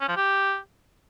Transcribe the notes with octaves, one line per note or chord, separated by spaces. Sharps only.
C#4
F3
G4